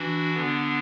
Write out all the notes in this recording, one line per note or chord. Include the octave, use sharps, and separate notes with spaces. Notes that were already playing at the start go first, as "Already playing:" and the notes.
Already playing: E3 D4 F#4
D3 B3 D4